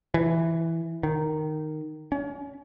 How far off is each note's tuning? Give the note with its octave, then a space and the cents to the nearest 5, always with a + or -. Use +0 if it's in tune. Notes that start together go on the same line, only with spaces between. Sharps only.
E3 +0
D#3 -10
C#4 +30